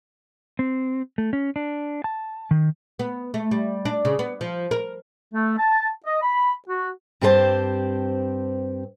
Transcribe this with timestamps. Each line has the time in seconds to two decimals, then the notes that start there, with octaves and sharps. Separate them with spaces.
0.59 C4
1.18 A3
1.33 C#4
1.56 D4
2.04 A5
2.51 D#3
2.99 B3
3.34 A3
3.51 G3
3.85 D4
4.05 C#3
4.19 B3
4.41 F3
4.71 A#4
5.34 A3
5.58 A5
6.06 D#5
6.23 B5
6.68 F#4
7.21 G2 C4 G4 A4 C5 A5